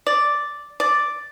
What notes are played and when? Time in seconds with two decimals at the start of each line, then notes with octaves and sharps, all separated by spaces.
0.07 D5
0.80 D5